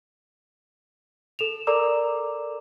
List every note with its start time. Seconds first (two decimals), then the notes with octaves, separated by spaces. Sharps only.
1.39 A4 E7 F7
1.67 A4 A#4 D5 A#5 D6 E6